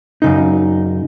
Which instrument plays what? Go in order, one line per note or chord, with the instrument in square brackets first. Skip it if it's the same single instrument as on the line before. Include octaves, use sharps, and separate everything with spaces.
[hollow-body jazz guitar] F#2 C#3 D#4